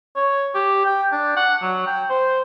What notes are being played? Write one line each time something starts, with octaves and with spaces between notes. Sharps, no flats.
C#5
G4
G5
D4
F#5
F#3
G5
C5